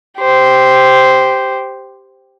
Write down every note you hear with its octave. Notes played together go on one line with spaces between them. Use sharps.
G4 C5